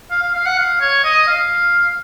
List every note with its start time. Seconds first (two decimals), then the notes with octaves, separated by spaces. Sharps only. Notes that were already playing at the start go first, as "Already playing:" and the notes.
0.11 F5
0.23 F5
0.35 F5
0.46 F#5
0.58 F5
0.81 C#5
1.04 D#5
1.27 F5